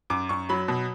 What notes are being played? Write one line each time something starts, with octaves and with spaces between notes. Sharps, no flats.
F#2 D6
F#2 C#6
F#3 B5
B2